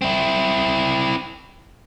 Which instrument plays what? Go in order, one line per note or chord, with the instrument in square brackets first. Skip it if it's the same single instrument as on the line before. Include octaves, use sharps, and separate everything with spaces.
[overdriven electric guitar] C4 E4